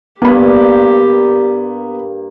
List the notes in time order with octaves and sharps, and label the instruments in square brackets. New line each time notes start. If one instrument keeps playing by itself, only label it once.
[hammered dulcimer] G2 A#3 [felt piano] B3 B5 [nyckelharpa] G4